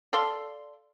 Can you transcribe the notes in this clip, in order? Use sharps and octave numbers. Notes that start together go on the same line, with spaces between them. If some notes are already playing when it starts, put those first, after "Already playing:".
A4 D5 F5 C6